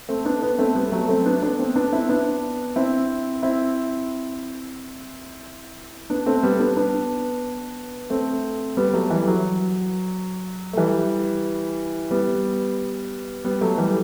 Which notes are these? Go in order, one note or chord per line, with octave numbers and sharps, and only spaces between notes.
A3 C4
B3 D4
B3 D4
A3 C4
G3 B3
F#3 A3
A3 C4
B3 D4
B3 D4
A3 C4
B3 D4
C4 E4
B3 D4
C4 E4
C4 E4
B3 D4
A3 C4
G3 B3
B3 D4
B3 D4
A3 C4
G3 B3
F#3 A3
E3 G3
F#3
A3
E3 G3
G3 B3
G3 B3
F#3 A3
E3 G3